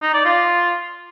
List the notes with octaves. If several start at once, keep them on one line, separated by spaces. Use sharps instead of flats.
D#4
D5
F4